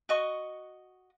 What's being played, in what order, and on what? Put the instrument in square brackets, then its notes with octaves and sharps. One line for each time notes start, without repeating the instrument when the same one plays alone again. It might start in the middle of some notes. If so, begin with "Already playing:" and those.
[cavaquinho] F#4 D#5 C#6